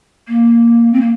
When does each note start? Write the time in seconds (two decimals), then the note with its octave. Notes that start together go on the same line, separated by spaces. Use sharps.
0.28 A#3
0.93 C4
1.01 A#3